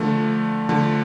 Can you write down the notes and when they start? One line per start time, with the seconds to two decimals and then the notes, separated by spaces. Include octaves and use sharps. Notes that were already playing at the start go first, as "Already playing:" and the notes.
Already playing: D3 F3 A3
0.69 D3 F3 A3